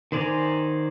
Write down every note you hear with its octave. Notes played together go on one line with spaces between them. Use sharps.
D#3 C5 D5 G#5 A#5